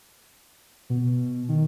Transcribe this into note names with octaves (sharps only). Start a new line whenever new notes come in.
B2
D#3